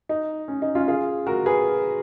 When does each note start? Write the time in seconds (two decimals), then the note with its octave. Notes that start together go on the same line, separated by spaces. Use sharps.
0.09 D#4
0.48 C#4
0.62 D#4
0.75 C#4 F4
0.88 F4 G#4
1.27 F#4 A#4
1.46 G#4 B4